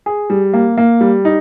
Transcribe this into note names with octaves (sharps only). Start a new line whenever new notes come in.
G#4
G3
A#3
A#3
G3
D#4